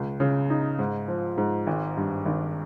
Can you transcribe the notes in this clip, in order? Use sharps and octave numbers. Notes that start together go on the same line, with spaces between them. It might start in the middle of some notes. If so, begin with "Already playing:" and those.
Already playing: C#2
C#3
D#4
G#2
F3
G#2
G#1
G2
G#1